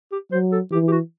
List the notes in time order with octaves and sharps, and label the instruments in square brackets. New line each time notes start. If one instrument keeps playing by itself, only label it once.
[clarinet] G4
[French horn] F#3 [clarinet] C5
[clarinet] A4
[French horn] E3 [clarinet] G4
[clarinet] G4
F#4